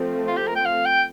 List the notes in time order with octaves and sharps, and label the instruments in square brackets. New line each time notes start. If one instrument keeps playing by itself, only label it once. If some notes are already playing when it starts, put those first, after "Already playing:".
Already playing: [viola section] F3 A3 C4
[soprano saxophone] F4
G4
A#4
G5
F5
G5